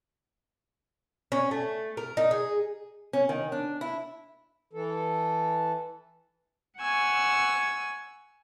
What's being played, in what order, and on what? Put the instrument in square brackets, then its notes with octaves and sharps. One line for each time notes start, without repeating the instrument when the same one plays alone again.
[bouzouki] C#4
A3
A#4
D#4
G#4
[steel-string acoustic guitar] C#4
D#3
D4
E4
[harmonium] E3 A4
[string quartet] F#5 G#5 C#6 E6